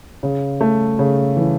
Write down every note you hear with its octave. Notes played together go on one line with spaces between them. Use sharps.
C#3
A3
C#3
E3